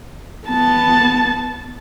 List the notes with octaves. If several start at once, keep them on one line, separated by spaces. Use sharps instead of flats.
B3 A5